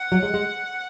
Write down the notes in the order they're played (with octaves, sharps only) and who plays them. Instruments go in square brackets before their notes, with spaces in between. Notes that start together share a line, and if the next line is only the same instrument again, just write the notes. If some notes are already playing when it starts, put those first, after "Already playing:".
Already playing: [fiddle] F#5
[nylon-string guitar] F#3
G#3
G#3